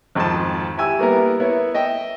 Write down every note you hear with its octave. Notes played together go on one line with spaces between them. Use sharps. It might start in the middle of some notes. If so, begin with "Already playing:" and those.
G#1 F2 F4 A5
E4 G4 G#5 E6
G3 A#3 B3 E4 A#4
B3 E4 A#4 C#5
D#5 E5 G5